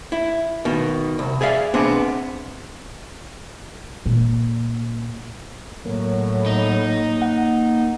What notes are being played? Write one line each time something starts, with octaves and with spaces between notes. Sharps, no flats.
E4
B2 D#3
C2
G#4 D5 E5 F5
B2 B3 C4 D4 G#4
A#2
A2 F#3 A#3
D#4
F#5